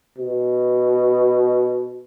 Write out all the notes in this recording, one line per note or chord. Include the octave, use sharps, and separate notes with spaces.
B2